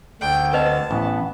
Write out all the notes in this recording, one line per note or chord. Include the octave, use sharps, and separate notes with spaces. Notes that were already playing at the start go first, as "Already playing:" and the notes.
D2 D3 G5
B4 C5 D#5 A5
A1 B3